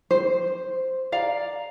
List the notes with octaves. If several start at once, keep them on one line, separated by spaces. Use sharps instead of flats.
C5
D5 F5 A#5